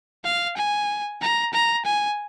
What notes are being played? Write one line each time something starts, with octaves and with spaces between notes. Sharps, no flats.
F5
G#5
A#5
A#5
G#5